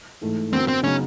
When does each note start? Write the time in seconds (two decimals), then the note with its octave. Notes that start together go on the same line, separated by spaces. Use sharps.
0.21 G#2 E3 A3
0.53 F#2 D3 F#3 B3 C4
0.68 C4
0.83 C#3 F#3 B3 C#4 D#4